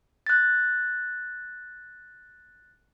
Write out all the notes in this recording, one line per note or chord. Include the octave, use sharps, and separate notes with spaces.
F#6 A6